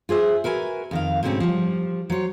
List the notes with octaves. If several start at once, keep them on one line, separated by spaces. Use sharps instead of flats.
F4 G#4 C5 E5
F#4 A#4 B4 E5 G#5
F2 D#3 F5
G#2 B2 D3 C4 C#4
F3 G3
F#3 C5 C#5